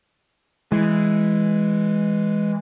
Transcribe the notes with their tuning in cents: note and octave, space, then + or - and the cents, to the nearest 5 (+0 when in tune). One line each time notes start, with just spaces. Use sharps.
E3 +0 G#3 +0